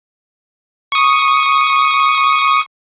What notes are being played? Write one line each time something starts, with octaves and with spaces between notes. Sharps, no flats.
C#6 D#6